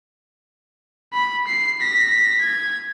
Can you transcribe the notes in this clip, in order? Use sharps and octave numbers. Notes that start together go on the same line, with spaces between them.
B5
C7
A#6 B6
G#6